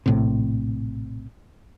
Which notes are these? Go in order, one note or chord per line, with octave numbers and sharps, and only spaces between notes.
A#1 A2 C3